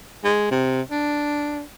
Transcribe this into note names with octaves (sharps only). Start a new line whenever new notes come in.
G#3
C3
D4